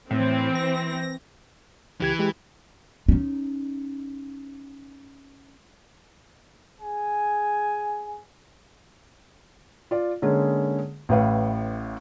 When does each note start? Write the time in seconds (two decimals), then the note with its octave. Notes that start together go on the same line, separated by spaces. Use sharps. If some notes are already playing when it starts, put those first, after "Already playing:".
0.11 A2 E3 C4
0.55 A#6
2.01 C#2 E3 G4 G#6
2.19 G#3 G4
3.09 C#4 D#4
6.82 G#4 G#5
9.91 F4 D5
10.22 D3 G#3 A#3 C#4 G#4
11.09 A1 A2 B4 F5